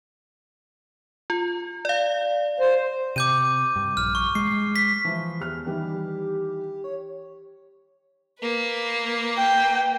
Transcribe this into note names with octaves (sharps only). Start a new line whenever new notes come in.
F4
D5 F5
C5
C3 D6 G6 D#7
G2
A#1 F6
C#6
G#3 C7
B6
E3 F3
E2 G4 F6
D#3 E3 G3 G4
C#5
A#3 B4
G5